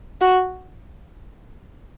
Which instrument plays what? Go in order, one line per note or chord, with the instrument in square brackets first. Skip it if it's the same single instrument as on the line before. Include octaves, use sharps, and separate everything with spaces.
[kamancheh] F#4